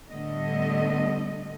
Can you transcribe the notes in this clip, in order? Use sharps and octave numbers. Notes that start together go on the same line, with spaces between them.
A2 D3 G3 A3 B3 D#5